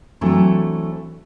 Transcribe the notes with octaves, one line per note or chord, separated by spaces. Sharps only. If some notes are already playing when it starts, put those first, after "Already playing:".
E3 F#3 A3 C4 D4 E4